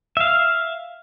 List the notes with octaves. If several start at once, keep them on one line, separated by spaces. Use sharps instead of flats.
E5 F5